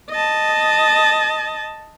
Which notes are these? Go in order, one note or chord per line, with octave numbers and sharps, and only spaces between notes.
D#5 A5